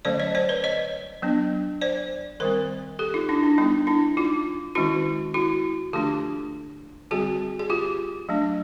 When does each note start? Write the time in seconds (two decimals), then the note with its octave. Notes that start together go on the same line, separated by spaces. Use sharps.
0.05 D3 F#3 A3 C#4 C5 D5
0.20 C#5 D#5
0.35 C5 D5
0.49 B4 C#5
0.64 C#5 D#5
1.22 F#3 B3 D4
1.81 C5 D5
2.40 D#3 G3 C4 A#4 C5
2.99 G4 A4
3.14 D#4 F4
3.29 D4 E4
3.43 D4
3.58 G3 B3 D4 D#4
3.87 D4 E4
4.17 D#4 F4
4.75 D#3 G#3 C#4 E4 F#4
5.34 E4 F#4
5.93 D3 F3 A3 D4 F4 G4
7.11 D3 G3 C4 F#4 G#4
7.59 G#4
7.70 F4 G4
8.29 F#3 A3 D4